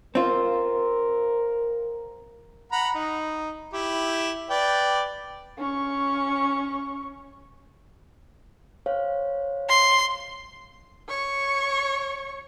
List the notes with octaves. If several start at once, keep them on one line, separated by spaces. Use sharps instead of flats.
C4 F4 A#4
F#5 A#5 B5
D#4
E4 G4
B4 D5 G5
C#4 C#6
C5 C#5 F5
C6
C#5 C#6